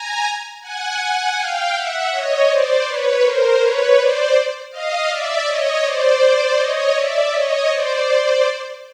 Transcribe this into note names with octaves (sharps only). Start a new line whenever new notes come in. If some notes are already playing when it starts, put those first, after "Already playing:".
Already playing: G#5 A#5
F#5 G#5
F5 G5
E5 F#5
C#5 D#5
C5 D5
B4 C#5
A#4 C5
B4 C#5
C5 D5
D#5 F5
D5 E5
C#5 D#5
C5 D5
C#5 D#5
D5 E5
C#5 D#5
C5 D5